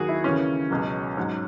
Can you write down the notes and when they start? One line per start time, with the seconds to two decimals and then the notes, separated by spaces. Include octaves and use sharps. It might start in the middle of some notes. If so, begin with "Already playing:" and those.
Already playing: D#2 D#3 F#3 F#4 G#4
0.09 E4
0.24 D#2 C#3 E3 C#4
0.70 C#2 B2 F#3
1.17 G#2 F#3